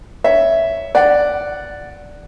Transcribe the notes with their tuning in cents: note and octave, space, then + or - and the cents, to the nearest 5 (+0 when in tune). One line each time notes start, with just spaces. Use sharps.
C#5 +10 E5 +0
D5 +0 F#5 +0